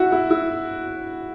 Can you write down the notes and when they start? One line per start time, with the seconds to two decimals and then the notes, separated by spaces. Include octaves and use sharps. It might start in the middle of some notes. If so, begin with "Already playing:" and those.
Already playing: E4 F#4
0.12 E4
0.30 E4